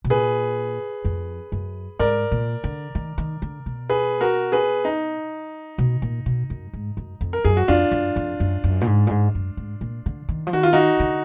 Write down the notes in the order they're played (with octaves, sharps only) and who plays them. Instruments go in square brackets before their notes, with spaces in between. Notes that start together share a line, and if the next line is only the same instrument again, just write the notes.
[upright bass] B2
[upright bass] A#2 [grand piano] G#4 B4
[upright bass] F2
F#2
[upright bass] G#2 [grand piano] A#4 D5
[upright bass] A#2
D3
D#3
D#3
D3
B2
[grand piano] G#4 B4
F#4 A#4
G#4 B4
D#4
[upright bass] B2
A#2
B2
F#2
G#2
F#2
F2
[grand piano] A#4
[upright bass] F#2 [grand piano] G#4
[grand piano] F#4
[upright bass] F2 [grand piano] D4 F4
[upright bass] F#2
F2
F#2
F#2
A#2
G#2
A#2
G#2
F#2
G#2
A#2
D3
D#3
F3
[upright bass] D#3 [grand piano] F#4
[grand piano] F4
D#4 F#4
[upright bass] D3